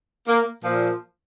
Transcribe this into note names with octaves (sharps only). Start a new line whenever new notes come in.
A#3
A#2 F3